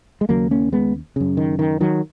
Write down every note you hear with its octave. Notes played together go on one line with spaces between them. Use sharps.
G#3
D#2 C#3 F#3 A#3
A#3 C#4
G#3 B3
F#2 C#3
D#3
D#3
D#3 F#3